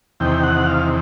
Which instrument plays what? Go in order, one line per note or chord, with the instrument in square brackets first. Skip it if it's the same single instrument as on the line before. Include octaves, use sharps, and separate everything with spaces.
[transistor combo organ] E2 C3 D#3 G5
F#5
F5